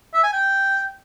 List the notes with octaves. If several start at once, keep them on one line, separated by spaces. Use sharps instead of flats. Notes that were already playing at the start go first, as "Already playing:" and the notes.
E5
G#5
G5